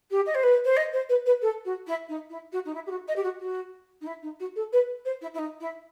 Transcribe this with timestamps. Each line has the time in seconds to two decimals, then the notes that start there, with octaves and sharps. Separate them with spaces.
0.10 G4
0.26 D#5
0.34 C5
0.43 B4
0.64 C5
0.76 D#5
0.93 C5
1.09 B4
1.26 B4
1.41 A4
1.64 F#4
1.86 E4
2.08 D#4
2.29 E4
2.52 F#4
2.65 D#4
2.74 E4
2.86 G4
2.90 F#4
3.07 D#5
3.16 G4
3.23 F#4
3.40 F#4
4.01 D#4
4.06 E4
4.22 D#4
4.39 F#4
4.55 A4
4.72 B4
5.05 C5
5.21 E4
5.34 E4
5.38 D#4
5.60 E4